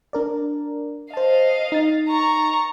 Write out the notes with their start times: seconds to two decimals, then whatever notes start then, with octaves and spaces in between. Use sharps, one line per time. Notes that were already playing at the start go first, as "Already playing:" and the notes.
0.13 D4 A#4 D5
1.14 C5 D#5 F5 A5
1.72 D#4 A6
2.09 A#5 C#6